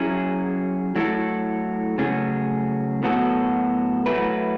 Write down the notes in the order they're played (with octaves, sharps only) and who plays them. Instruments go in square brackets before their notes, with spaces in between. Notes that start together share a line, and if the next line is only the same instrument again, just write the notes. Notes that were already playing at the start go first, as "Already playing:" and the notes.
Already playing: [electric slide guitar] F#3 C#4 E4 G#4
F#3 A3 E4 A4
C#3 F#3 A3 C#4 G#4
A2 F#3 B3 F#4 A4
F#3 A3 E4 B4